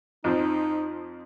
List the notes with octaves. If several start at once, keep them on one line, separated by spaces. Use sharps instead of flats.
F2 F3 C4 D#4